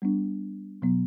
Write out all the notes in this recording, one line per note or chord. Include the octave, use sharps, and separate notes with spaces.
G3 B3 D4
B2 F#3 B3